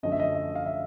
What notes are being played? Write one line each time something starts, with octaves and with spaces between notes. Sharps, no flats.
F#2 D3 F3 A3 D#5
E5
D#5
E5
F5
E5